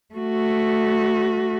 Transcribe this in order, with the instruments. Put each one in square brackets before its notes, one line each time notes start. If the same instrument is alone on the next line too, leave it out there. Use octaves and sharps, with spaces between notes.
[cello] A3 F#4